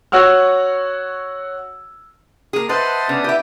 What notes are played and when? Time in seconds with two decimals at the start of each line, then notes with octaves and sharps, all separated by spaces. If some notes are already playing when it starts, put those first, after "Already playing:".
0.12 F#4 C#5 F#5 E6 F6
2.53 A#3 G#4
2.69 B4 C5 D#5 E5 F#5 A5 C6
3.09 C#3 B3 D4 D#6
3.24 E4 G4 B4 E5